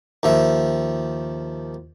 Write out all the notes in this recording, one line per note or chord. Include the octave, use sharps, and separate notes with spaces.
D#2 F3 E5